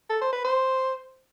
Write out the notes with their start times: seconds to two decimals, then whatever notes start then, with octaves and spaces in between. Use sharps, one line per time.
0.09 A4
0.21 C5
0.33 B4
0.45 C5